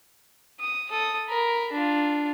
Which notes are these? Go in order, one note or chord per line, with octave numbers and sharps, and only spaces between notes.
D#6
A4 D#6
A#4 B5
D4 F4